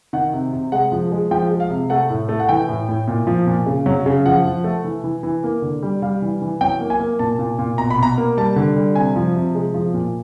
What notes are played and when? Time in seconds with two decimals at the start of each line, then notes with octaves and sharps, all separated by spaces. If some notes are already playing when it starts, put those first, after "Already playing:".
0.13 D#3 F#5
0.33 C3
0.53 C3
0.72 G#3 F#5
0.92 F3
1.12 G#3
1.31 F3 G5
1.51 G#3
1.60 F5
1.70 C3
1.90 A3 F#5
2.10 A2
2.29 A3
2.40 F#5
2.49 E3 G5
2.68 A2
2.89 A2
3.07 A#2
3.27 F3
3.47 A#2
3.66 C#3
3.86 F#3
4.06 C#3
4.25 F3 F#5
4.45 F3
4.64 A3
4.85 E3
5.04 E3
5.23 E3
5.44 A#3
5.62 D3
5.82 G3
6.02 G3 F5
6.22 E3
6.42 E3
6.61 F#3 G5
6.81 A#3
6.90 G#5
7.00 A#3
7.19 A#2 A5
7.39 A#2
7.59 A#2
7.78 B2 A#5
7.90 B5
7.98 B2 A#5
8.18 A#3
8.37 G3 A5
8.56 D3
8.76 G3
8.95 C3 G#5
9.16 F3
9.36 C3
9.55 G#3
9.74 F3
9.94 A#2